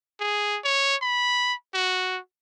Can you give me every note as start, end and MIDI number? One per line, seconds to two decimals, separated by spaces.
0.20 0.59 68
0.64 0.96 73
1.02 1.54 83
1.74 2.19 66